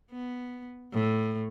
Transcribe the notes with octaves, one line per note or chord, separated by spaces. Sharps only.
B3
A2